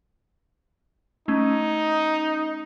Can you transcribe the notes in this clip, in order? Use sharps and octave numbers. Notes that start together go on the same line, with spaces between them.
A3 C#4 D#4